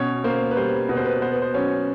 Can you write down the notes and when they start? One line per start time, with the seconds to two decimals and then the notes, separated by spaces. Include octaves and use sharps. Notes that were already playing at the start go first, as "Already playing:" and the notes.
Already playing: B2 C#4 C#5
0.24 A#3 C5
0.51 B4
0.57 G3 C5
0.89 B2 B4
0.97 C5
1.05 B4
1.22 B3 C5
1.32 B4
1.42 C5
1.54 F#3 C#4 C#5